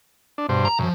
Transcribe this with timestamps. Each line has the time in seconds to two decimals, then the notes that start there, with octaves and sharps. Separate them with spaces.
0.38 D4
0.49 G2 B2 C5
0.65 A#5
0.79 B1 F#2 F3